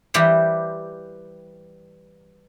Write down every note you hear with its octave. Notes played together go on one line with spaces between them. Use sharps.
E3 G3 G4 C5